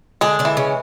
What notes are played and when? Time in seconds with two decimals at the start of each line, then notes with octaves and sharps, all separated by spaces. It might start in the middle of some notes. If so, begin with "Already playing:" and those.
0.21 D3 G#3 D4
0.39 D3 D4
0.45 E3
0.57 C#3 C#4